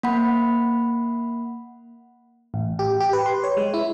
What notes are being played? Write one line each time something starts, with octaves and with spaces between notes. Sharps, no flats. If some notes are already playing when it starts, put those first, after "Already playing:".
A#3 F#5 B5
A1
G4
G4
B4
C6
C#5
G#3
E4